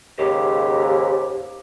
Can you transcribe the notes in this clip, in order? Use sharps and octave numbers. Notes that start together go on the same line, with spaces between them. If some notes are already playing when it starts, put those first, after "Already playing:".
D#2 G#2 C#3 G4